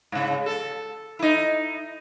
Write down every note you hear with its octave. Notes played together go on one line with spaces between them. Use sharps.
G#2 C#3
A4
D#4 E4